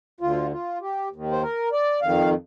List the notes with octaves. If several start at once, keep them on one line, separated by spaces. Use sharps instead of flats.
D2 D3 F4
F4
G4
D#2 D#3
C5
A#4
D5
F2 D#3 F5